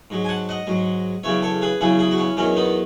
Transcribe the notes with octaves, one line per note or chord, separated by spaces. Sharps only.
G#2 F#3
G#5
F#5 A5
D#5 F#5
G#2 F#3
E2 C#3 F#3 C#5 E5
A4 C#5
G#4 B4
E2 C#3 F#3 E4 G#4
E4 G#4
F#4
C#4 E4
E2 D#3 F#3 C#4 E4
B3 D#4